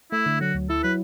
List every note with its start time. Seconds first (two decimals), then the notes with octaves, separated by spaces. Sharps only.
0.12 A3 E4
0.26 D3
0.41 F#3 F#4
0.54 D2
0.70 E4 A4
0.83 F#3 B4